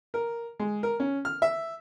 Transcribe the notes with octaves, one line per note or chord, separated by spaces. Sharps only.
A#4
G#3
A#4
C#4
F6
E5